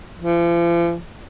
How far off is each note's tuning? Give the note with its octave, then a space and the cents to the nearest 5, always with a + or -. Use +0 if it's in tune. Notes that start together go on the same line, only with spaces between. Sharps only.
F3 -40